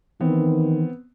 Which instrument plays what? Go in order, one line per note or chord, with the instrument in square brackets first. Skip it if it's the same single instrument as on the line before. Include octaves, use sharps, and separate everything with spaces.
[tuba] D#3 [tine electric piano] E3 [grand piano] B3 C4